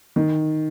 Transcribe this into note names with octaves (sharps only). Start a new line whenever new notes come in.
D#3